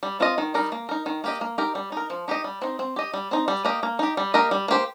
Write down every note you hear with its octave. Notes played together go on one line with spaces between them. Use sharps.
G3
C4 F4 D#5
D#3
G3 D#4 A#4
A#3
D#4 A#4
D#3
A#3 G4 D#5
A#3
D#4 G4 A#4
G3
D#4 A#4
F3
D#4 G4 D#5
G3
C4 D#4
C4
G4 D#5
G3
C4 D#4
G3
A#3 G4 D#5
A#3
D#4 G4
G3
A#3 G4 A#4 D#5
G3
A#3 G4 C5